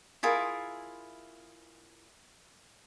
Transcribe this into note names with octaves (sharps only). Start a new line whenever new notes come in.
E4 F4 G#4 A#4